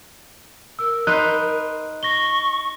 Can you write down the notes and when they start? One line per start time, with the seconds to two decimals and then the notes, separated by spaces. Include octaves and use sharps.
0.79 A#4 E6
1.07 D#4 B4 C5 F#6
2.03 C#6 A#6 G7